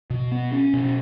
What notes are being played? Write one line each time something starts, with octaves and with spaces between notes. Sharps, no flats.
B2
B3
C#4
B2